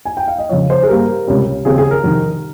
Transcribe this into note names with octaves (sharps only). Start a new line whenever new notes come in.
G#5
G5
F5
D#5
F2 C#3 F3 C#5
C5
G#4
G2 G3 A#3 A#4
C#2 C3 G3 C#4
D#2 C#3 F3 C4 G#4
G#4
A#4
F2 C3 D#3